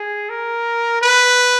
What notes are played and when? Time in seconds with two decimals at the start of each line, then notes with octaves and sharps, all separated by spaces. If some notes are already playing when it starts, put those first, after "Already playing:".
Already playing: G#4
0.30 A#4
1.02 B4